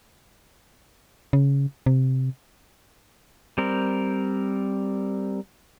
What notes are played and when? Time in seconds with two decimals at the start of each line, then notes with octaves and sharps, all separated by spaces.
1.33 C#3
1.86 C3
3.58 G3 C4 A#4